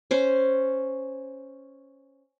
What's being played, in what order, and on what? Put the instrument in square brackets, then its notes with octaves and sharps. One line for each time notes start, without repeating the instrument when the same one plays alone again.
[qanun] C#4 C5